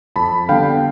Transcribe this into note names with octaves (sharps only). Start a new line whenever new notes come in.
F2 A5 B5
D3 G3 B3 F5 G5